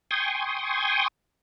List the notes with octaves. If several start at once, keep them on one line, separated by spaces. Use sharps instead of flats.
G5 G#5 C6 C#6 D#6